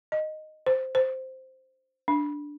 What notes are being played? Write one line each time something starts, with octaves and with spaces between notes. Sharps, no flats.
D#5
C5
C5
D4